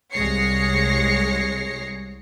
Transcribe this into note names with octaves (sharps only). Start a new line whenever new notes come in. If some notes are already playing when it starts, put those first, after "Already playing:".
C2 G#3 C#5 A#6 C7 C#7